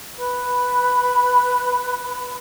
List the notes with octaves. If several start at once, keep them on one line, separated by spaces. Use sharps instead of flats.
B4 B5